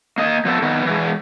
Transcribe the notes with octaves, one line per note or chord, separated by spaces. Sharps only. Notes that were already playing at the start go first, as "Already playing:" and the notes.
A#3 D#5
F3 B3 G#4 A4
D#3 B3
E3 G#3